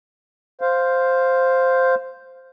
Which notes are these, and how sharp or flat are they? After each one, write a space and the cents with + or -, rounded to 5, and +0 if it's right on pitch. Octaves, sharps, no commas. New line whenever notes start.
C5 +0 F5 +0